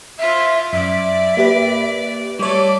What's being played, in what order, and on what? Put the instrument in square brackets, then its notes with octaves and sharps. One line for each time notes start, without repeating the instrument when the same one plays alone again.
[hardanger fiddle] F4 C5 [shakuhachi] E5
[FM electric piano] F#2 [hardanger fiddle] D5 [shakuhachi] E5
[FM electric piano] A#3 G4 B4
[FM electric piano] G3 C#5 [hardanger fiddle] A3 D5 [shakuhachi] D6